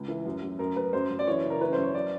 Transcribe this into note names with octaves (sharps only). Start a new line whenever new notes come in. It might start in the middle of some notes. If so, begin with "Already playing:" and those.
Already playing: C#2
E3
F#2
F#2
F#2 A#4
F#2 B4
F#2 C5
F#2
D5
E3 C#5
C#3
A#4
E3 B4
F#2 C5
C#5
D5